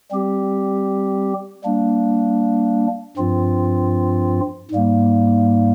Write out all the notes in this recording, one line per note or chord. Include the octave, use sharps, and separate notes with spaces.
G3 C4 G4
G3 A#3 D4
G2 F3 C4 F4
G#2 G3 A#3